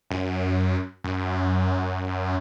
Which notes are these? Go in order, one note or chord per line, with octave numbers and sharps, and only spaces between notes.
F#2
F#2